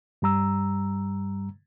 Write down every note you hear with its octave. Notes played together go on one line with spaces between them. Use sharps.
G2 G3 A#5 E6